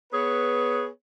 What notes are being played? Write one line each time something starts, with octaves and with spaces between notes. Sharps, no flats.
B3 G#4 B4 C#5